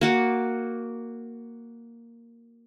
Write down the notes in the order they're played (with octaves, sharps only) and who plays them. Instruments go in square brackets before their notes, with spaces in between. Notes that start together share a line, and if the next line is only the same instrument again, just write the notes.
[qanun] A#3 F#4 D6